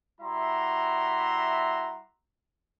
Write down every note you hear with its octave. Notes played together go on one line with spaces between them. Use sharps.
G3 E4 F#4 E5 A#5 C6